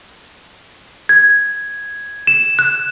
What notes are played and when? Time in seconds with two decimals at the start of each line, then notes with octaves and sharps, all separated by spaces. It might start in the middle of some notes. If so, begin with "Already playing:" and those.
1.09 G#6
2.27 E7
2.59 F#6